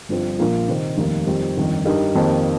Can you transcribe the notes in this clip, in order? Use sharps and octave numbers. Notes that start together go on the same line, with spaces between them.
G1 G2 F3 C4
A#1 A#2 A#3 F4
C3 D#3 C4 D#4
F1 D#2 D#3 G3 A#3
F2 D#3 G3 C4
G1 F2 D#3
G2 G3 D#4 A#4
F2 D#3 A#3 G4 C5